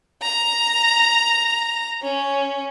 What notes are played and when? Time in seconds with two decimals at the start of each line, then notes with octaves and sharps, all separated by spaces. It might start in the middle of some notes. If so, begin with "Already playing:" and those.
0.22 A#5
2.02 C#4